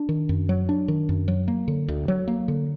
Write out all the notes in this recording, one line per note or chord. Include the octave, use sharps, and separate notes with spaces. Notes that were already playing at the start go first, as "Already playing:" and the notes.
Already playing: D4
D#3
F#2
F#3
D4
D#3
F#2
F#3
A#3
D3
D2
F#3
A#3
D3